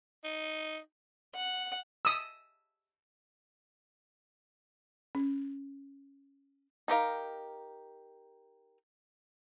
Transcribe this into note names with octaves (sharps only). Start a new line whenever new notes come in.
D#4
F#5
D#6 E6
C#4
D#4 G4 A#4 F5